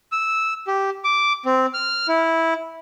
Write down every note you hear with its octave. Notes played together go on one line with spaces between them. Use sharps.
E6
G4
D6
C4
F6
E4